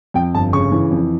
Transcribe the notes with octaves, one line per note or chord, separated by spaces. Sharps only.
F2 G5
G1 A5
C#3 C#6
E3
F2